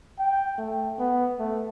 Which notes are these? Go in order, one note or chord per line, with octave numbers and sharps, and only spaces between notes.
G5
A3
B3
A3